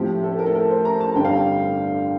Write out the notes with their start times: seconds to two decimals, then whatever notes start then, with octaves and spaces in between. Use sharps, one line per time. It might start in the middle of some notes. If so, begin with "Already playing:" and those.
Already playing: A2 F3 C4 G4
0.23 A4
0.39 A#4
0.46 A4
0.55 A#4
0.70 C5
0.85 A#5
1.00 A5
1.15 G1 G2 D3 G3 C4 G5
1.25 F5
1.34 G5